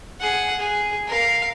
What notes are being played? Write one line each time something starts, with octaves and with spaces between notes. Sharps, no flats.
G#4 F#5
G#4
A#4 F5